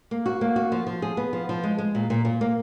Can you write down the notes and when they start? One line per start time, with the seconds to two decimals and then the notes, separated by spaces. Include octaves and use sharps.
0.11 A#3
0.26 F#4
0.41 A#3
0.56 F#4
0.72 F3
0.87 F3
1.02 G#4
1.17 B3
1.33 F3
1.49 F3
1.63 G#3
1.78 G#3
1.95 A#2
2.10 A#2
2.25 A#2
2.41 A#3